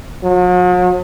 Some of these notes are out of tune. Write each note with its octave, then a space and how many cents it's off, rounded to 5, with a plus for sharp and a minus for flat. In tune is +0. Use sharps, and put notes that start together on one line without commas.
F#3 -45